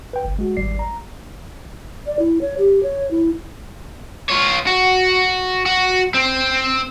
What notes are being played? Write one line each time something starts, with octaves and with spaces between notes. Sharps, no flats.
B4 G5
G1
G#3 F#4
G#1 G3 D5 C7
A#5
D5
E4
C#5
G4
C#5
E4
F4 C#5
F#4
F#4
C4